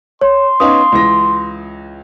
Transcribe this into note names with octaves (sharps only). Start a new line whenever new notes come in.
C#5 C6
B3 C#4 D#4 F5 D#6
C#2 E3 A#6